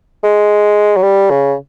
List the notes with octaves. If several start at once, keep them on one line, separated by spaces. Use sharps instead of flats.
G#3
F#3
G3
C#3